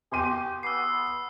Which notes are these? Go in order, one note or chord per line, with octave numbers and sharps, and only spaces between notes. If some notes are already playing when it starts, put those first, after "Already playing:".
G4 G#5 C6 D#7
B3 E6 C7